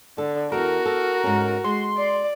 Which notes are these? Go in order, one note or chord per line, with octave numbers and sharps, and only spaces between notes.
D3 A4
E2 F#4 A4 A#4
A4
G#2 C#4
G#3 C6
D5